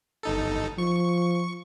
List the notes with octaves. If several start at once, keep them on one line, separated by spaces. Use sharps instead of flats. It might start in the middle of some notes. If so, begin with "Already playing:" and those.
G1 D#4 A4
F3 C#6